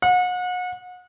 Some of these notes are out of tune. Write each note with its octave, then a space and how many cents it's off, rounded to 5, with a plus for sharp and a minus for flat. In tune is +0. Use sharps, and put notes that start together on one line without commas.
F#5 -35